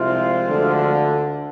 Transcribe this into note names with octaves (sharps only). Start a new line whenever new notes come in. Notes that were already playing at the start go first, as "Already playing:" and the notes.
Already playing: C2 C3 F3 G#3 C4 F4
D2 D3